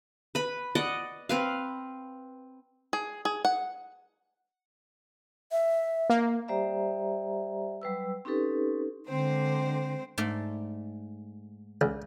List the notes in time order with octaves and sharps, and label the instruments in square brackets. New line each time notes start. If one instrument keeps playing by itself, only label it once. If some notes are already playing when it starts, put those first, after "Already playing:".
[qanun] B4 B5
D5 D#5 F#5
C4 B4 F5
[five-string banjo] G#4
G#4
F#5
[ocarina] E5
[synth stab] A#3
[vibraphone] G3 G4 C5 D5 E5 A#5
F#3 G3 B4 E6
C4 C#4 D#4 G4 A4 B4
[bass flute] D3 [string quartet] G#3 C4 C5
[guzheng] G#2 A3 D5
[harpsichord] C#2